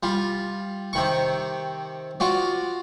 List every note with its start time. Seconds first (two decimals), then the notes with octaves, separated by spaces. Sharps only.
0.03 G3 F4
0.93 C3 D#3 C#6
2.20 F4 F#4 D5